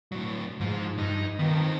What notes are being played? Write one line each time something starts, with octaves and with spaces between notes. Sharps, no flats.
A2 F#3
G#2 F3
G2 D#4
D#3 B3 F4
C4 A4